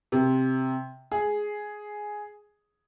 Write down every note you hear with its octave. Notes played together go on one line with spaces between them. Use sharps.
C3
G#4